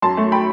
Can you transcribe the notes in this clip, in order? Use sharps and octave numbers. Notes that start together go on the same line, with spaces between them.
F#2 A5 C6
A3
G5 B5